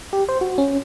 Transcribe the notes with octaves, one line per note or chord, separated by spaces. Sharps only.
G4
C5
F#4
C#4